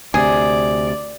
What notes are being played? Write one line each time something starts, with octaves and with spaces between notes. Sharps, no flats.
D2 C3 G#4 D5